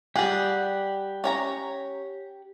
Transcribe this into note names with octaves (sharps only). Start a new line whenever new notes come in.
G3 G4 G#4 F#5
C#4 C#5 A#5